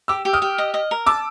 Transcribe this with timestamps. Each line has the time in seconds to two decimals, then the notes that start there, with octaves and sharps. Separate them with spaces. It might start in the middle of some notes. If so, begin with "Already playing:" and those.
0.08 G4 D6 E6
0.25 G4
0.33 D#6 F6
0.42 G4
0.58 D#5
0.74 D#5
0.91 A#4
1.06 A5 D6 E6